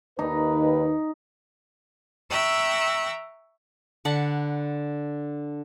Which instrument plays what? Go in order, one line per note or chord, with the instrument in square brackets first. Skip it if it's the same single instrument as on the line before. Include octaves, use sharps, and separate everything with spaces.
[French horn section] D#2 D#3 B4 [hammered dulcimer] D#4
[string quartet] E5 G5 A#5 C#6 E6 F#6
[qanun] D3 F#5 A5 B5